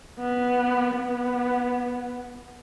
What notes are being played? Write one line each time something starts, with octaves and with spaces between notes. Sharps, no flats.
B3
B3